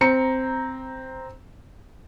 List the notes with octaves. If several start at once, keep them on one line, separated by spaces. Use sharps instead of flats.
C4 A#5 C#7